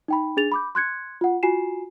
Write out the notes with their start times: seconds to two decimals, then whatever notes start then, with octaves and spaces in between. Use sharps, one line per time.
0.08 D#4 G5 B5
0.37 D4 G#4 A6 F7
0.52 B5 D6 G6
0.75 C6 F#6 G#6 C#7
1.21 F4 F#5
1.43 F4 F#4 G#5 C7 E7